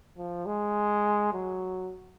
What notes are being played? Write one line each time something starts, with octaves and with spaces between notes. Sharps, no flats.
F3
G#3
F#3